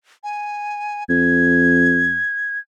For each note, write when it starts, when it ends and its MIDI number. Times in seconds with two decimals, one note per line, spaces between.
0.24 1.04 80
1.09 2.20 41
1.09 2.59 92